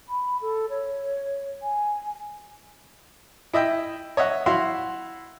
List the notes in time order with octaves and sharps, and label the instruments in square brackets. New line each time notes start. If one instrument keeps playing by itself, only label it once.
[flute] B5
A4
C#5
G#5
[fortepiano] E4 D#5 E5 G5
C#5 D#5 E5 F#5
E4 F#4 E5 F5 C6